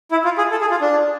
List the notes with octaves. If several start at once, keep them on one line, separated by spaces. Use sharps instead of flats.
E4
F4
G#4
A4
G#4
F4
D4